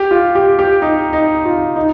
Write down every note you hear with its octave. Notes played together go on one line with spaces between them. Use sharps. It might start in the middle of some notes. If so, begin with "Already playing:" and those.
Already playing: G4
F4
G4
G4
D#4
D#4
F4
D#4